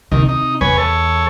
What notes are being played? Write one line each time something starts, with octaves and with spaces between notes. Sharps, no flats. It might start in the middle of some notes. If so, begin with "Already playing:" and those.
D#2 C3 D#3
D#4
E2 B4 C#5 G#5
A4 C#5